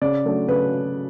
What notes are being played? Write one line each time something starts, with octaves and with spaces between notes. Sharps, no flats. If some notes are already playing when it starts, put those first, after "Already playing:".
C#3 D5
F#3 A3 D4
C#3 B4